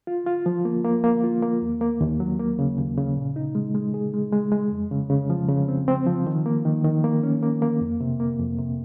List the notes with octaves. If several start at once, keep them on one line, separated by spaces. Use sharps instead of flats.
F4
F4
F3
A#3
A#3
A#3
F4
A#3
D#2
A#3
D#2
F#3
A#3
C#3
D#2
C#3
A#2
D#4
G#3
G#3
G#4
G#3
G#3
G#3
F2
C#3
C#3
F3
C#3
C4
C4
F3
D#3
A#3
D#3
D#3
A#3
C#4
A#3
A#3
F2
C3
A#3
F2
C3